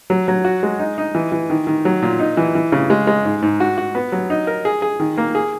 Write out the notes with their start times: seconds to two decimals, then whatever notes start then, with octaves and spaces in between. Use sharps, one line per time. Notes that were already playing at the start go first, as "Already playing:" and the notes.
0.10 F#3
0.28 F#3
0.45 F#4
0.63 G#3
0.79 D#4
0.98 D#4
1.15 E3
1.32 E3
1.50 D#3
1.67 D#3
1.85 F#3
2.02 A#2
2.20 D#4
2.37 E3
2.55 E3
2.72 C#3
2.90 G#3
3.07 G#3
3.25 G#2
3.42 G#2
3.60 F#4
3.78 F#4
3.95 B3
4.12 F#3
4.30 D#4
4.47 A#4
4.65 G#4
4.82 G#4
5.00 D#3
5.18 A#3
5.35 G#4